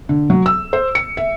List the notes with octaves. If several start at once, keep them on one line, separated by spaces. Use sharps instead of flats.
D3
F#3
E6
C5
C#7
E5